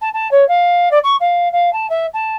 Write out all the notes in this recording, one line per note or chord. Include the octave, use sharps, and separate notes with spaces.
A5
A5
C#5
F5
D5
C#6
F5
F5
A5
E5
A5